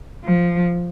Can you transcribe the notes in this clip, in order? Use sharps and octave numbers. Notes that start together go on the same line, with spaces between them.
F3